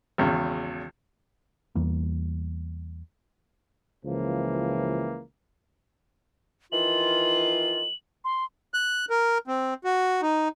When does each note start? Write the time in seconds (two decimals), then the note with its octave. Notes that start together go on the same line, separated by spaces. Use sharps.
0.18 G#1 E2 C#3
1.75 E2 E3 G3 A#3
4.04 C#2 E3 F3 A#3
6.72 D#3 E3 F4 F#7
8.25 C6
8.74 F#6
9.10 A#4
9.47 C4
9.84 F#4
10.22 D#4